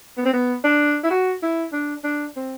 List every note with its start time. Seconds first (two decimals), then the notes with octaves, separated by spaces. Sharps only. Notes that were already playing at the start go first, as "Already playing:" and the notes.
0.17 B3
0.25 C4
0.33 B3
0.64 D4
1.04 E4
1.10 F#4
1.43 E4
1.73 D4
2.04 D4
2.36 C4